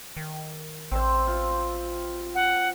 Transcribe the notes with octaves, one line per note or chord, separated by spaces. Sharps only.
D#3
A1 C4 C5 E5
F4
F#5